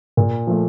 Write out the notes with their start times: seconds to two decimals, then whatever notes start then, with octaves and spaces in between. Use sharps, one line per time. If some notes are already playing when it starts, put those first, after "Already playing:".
0.17 A#2
0.47 F3 A3